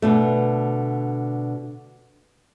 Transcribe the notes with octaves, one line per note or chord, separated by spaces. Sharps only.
B2 D3 A3